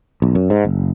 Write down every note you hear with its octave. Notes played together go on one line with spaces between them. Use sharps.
B1
F#2
G#2
F#1